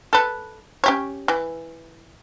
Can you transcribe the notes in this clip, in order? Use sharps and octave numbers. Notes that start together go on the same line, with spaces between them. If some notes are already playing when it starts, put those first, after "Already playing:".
A4 B4
C#4 G4 C#5
E3